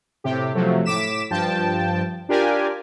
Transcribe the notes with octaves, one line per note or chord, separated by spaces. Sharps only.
A2 C3 G4
C3 F3 F#3 A3
A2 D6 B6 E7
G2 F3 G5 A5
D4 F4 G4 A#4 D5 G#5